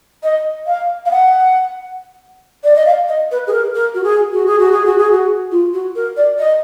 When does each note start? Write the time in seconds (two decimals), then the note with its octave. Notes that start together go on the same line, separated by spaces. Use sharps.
0.23 D#5
0.67 F5
1.06 F5
1.11 F#5
2.64 D5
2.75 D#5
2.86 F5
3.08 D#5
3.31 B4
3.47 G#4
3.53 A#4
3.75 A#4
3.95 F#4
4.04 G#4
4.33 F#4
4.47 G#4
4.59 F#4
4.72 G#4
4.86 F#4
4.98 G#4
5.11 F#4
5.52 F4
5.74 F#4
5.96 A#4
6.17 D5
6.39 D#5